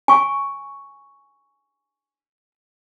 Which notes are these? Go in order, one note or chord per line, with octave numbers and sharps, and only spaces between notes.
G#5 C#6